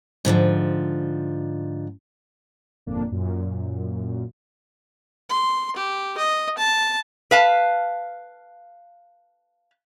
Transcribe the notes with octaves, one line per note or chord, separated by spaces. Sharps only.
G#2 D3 E3 F3
G1 F2 A#2 A#3 D4
F#2 A#2
C6
G4
D#5
A5
B4 F5 A5